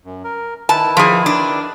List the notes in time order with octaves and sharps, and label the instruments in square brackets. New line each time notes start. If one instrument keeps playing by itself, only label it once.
[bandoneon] F#2
A#4
[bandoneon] D#3 E4 B4 [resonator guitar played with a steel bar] A5
[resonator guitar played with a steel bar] F3 G#4
D4